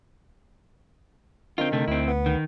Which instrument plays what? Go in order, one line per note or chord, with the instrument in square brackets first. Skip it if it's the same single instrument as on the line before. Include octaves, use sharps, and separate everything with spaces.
[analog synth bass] D3 [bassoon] D#3 [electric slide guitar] C4 F4
[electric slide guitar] C3 A3
[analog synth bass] D2 [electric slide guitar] C4 E4
[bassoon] B3
[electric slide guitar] D#3